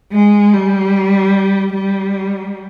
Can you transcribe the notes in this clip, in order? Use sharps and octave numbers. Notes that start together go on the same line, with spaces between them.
G#3
G3
G3